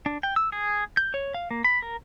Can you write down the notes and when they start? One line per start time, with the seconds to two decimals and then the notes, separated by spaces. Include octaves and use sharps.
0.06 D4
0.23 G5
0.36 E6
0.52 G#4
0.97 G6
1.14 C#5
1.34 F5
1.51 A#3
1.64 B5
1.82 A#4